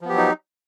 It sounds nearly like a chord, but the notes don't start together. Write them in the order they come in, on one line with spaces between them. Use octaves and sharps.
F3 B3 G4 F#3 D#4